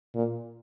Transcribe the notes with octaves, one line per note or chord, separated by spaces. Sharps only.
A#2